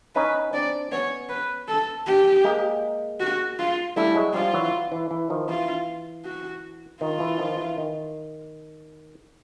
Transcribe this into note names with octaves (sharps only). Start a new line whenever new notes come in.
C#4 D#4 B4
C4 D4 D5
B3 C#4 C#5
B4
A4
G4
G#3 A#3
F#4
F4
G3 A3 E4
F#3 G#3
F3 G3 F4
E3 F#3
E3
E3
D#3 F3
E3 F4
F#4
D#3 F4
E3
D#3 F3
E3
D#3